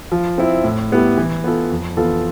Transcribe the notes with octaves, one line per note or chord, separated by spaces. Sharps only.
F3
C4 E4
A2
G3 B3 E4 G4
E3
B3 F4 A4
F2
E3 B3 F4 A4